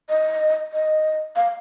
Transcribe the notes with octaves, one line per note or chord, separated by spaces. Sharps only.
D#5
D#5
F5